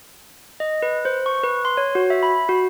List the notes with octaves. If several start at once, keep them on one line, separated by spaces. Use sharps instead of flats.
D#5
B4
C5
C#6
B4
C6
C#5
F#4
E5
B5
F#4